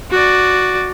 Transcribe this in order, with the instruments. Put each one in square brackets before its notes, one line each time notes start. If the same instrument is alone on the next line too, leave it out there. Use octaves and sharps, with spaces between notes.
[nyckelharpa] F#4 D5